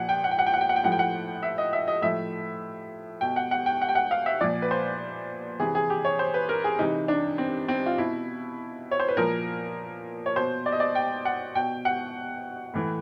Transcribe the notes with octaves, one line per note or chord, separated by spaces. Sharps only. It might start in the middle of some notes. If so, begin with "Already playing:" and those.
Already playing: A#2 F3 F#5
G5
F#5
G5
F#5
G5
F#5
G5
F#5
G5
A2 F3 F#5
G5
F#5
E5
D#5
E5
D#5
A2 F3 E5
B2 G5
F#5
F#5
G5
F#5
G5
F#5
F5
E5
A#2 F3 D5
B4
C5
C3 E3 G#4
G#4
G4
C#5
C5
B4
A#4
G#4
C3 E3 D#4
D4
C4
C4
F4
B2 E4
C#5
C5
B4
A#2 F3 A#4
C#5
B2 C5
D5
D#5
D5
G5
F#5
B2 G5
F#5
A2 E3